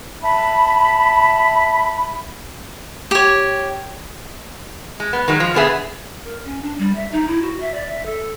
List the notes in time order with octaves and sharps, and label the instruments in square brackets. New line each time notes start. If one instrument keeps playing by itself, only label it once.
[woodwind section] E5 A5 B5
[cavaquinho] G4 C#5
[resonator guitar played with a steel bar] G#3
B3
D#3 F#3 G#3 B3
F3
B2 D3 B3 G#4 E5
[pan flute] A#4
C#4
D4
G3
E5
D#4
E4
F#4
E5
D5
E5
A4